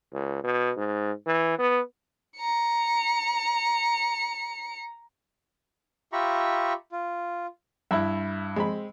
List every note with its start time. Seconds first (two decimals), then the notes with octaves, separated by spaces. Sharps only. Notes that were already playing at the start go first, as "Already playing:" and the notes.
0.13 C#2
0.44 B2
0.77 G#2
1.26 E3
1.59 B3
2.38 A#5 C#7
6.13 F4 G4 E5 A#5 B5 C#6
6.92 F4
7.91 G2 E4 E5 B5
8.56 G#3 C4 B5